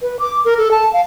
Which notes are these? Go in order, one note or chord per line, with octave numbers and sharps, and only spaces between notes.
B4
D6
A#4
A4
A5
F5